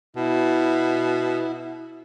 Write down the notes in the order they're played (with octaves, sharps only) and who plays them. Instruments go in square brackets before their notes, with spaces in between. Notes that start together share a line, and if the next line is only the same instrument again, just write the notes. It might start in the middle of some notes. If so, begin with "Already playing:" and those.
[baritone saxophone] B2 [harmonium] E4